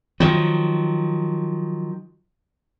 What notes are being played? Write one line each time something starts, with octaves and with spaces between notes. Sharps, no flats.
D#3 F3 F#3